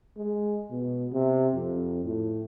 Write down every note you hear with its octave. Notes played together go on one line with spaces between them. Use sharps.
G#3
B2
C3
F2
A2